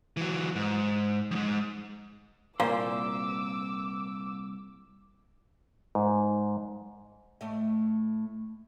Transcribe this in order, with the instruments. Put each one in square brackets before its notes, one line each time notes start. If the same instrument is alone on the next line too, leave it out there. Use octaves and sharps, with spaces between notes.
[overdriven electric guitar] E3 F#3
G#2
F2 G#2
[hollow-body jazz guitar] C2 A#3 C5 [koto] A#2 [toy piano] F5 [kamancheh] D6 E6
[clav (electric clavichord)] G#2
[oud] A2 A3 D#5